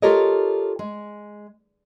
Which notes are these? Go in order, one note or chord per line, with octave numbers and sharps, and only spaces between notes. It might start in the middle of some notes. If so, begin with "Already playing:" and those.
F4 G4 A4 A#4 C#5 D#5
G#3